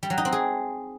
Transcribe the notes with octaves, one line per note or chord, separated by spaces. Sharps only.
G3
F#3
D#4
C4
G#4